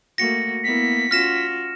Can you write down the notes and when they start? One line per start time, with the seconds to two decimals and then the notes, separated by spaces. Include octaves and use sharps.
0.18 A3 A#3 F#4 A#6 C#7
0.63 A#3 B3 E4 B6
1.11 C#4 F4 F#4 F6 A#6 E7